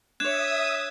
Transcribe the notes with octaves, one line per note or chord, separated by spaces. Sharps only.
D4 C#5 E5 D#6 F#6 G#6 E7